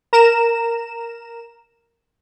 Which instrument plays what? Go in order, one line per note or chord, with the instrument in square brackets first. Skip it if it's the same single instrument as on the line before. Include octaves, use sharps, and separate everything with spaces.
[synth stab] A#4 A#5 E7